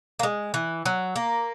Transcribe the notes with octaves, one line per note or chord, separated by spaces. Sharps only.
A#3
G#3
E3
F#3
A#3